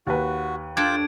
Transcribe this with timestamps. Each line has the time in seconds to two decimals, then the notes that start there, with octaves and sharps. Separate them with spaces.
0.07 D#2 F#4 B4
0.77 D4 F4 A4 G5 D6 G#6 D7